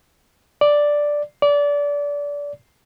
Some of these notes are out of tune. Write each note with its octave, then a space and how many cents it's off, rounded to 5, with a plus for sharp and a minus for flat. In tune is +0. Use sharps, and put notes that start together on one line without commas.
D5 +0
D5 -25